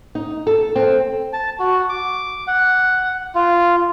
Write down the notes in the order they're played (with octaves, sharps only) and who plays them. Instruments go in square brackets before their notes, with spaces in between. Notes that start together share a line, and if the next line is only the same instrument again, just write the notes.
[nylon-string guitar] D#4
A4
C4
[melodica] A5
F#4
D6
F#5
F4